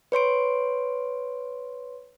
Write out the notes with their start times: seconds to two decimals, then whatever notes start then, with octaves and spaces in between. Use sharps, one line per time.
0.12 B4 C#5 C6 D7